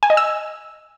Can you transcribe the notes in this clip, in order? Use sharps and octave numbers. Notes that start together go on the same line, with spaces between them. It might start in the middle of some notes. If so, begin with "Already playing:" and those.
G#5
D#5
E6